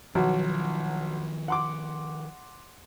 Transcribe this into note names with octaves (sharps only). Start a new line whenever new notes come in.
B1 D#3 F3 F#3
F#5 C6 D6